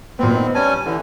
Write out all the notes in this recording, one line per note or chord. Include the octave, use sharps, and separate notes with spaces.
A#2 B3 C4
B3 D#4
G3 C#4 G#5 A5
D3 E3